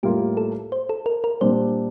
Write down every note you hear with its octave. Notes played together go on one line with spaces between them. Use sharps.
A2 G3 A#3 F4 G4
A4
C5
A4
A#4
A#4
A#2 G3 D4 C5